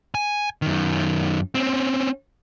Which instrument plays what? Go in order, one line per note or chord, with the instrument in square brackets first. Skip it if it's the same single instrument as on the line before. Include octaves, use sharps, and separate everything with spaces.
[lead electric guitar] G#5
F#2 D#3
C4 C#4